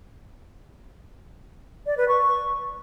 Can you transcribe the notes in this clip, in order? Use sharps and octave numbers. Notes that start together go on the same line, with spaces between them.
D5
B4
C#6